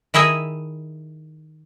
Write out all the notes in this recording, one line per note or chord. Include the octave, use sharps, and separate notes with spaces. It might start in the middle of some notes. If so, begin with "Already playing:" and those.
D#3 E4 G#4 D#5 E5